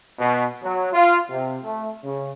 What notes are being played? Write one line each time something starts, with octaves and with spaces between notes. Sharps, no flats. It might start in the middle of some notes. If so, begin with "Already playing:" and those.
B2
F#3
F4
C3
A3
C#3